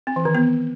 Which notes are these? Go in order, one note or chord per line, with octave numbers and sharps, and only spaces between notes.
C4
E3
D#3
B3